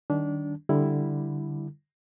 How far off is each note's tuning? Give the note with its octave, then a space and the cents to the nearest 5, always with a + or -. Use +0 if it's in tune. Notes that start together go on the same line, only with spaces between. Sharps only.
D#3 -25 G3 -25 D4 -25
D3 +0 G3 +0 E4 +0